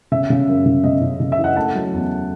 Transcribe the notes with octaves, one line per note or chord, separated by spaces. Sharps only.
C#3 E5
C#3
F#2
C#3
C#3 D#5
C#3
C#3
E5
E3
D#5 F#5
A3 F#5 A5
F#3
E2